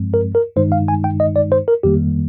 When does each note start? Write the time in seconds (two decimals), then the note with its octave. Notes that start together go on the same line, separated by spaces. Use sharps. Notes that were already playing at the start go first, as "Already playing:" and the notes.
Already playing: G2 F3 G#3 C4
0.14 A#4
0.35 A#4
0.56 G2 D#3 G#3 D#4 C5
0.72 F5
0.88 G#5
1.04 G5
1.20 D#5
1.36 D5
1.52 C5
1.68 A#4
1.83 F2 D#3 G3 A#3 G4